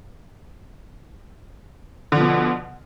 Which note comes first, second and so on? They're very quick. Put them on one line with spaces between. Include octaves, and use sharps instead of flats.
D3 F3 B2